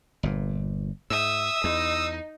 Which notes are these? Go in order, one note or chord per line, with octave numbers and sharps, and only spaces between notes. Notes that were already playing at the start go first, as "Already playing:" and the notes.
G1 A#2
G#2 E5 D#6 E6
E2 D#4